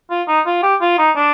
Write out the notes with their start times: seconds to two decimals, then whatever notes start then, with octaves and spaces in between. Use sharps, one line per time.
0.10 F4
0.28 D#4
0.46 F4
0.63 G4
0.81 F4
0.98 D#4
1.16 D4